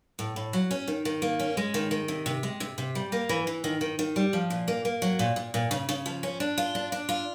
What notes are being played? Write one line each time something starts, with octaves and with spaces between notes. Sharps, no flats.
A2
A2
F#3
C#4
D#3
D#3
A#3
C#4
G#3
D#3
D#3
C3
C3
G#3
C3
C3
G3
A#3
E3
E3
D#3
D#3
D#3
G3
F3
A#2
A#3
A#3
F#3
A#2
A#2
A#2
C#3
C#3
F3
C#4
D4
F4
D4
D4
F4